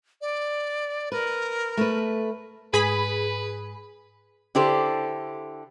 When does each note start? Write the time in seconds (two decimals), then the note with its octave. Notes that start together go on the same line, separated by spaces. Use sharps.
0.21 D5
1.12 A#4 B4
1.77 A3 B4
2.74 G#2 G#4 B4 B5
4.55 D3 E4 G4 A4 C5